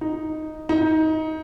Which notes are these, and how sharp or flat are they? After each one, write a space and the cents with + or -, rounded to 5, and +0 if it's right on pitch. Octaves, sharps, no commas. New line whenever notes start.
D#4 +0
D#4 +20